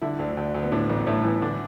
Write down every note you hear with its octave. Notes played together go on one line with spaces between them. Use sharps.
D3 E4
D2
D2
D2
B3
A2 D4
A1 B3
A2 A3
E3 B3
D3 D4